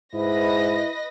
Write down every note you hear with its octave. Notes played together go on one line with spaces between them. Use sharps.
G#2 E4 B4 D#5 A#6